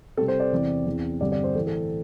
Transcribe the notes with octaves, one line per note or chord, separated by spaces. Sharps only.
C3 G3 C4 A4
C5
D5
E2 C3 E3 C4
E2 E3 C4
G2 D3 G3 C4 D5
D5
C5
A2 E3 A3 C4 A4
A4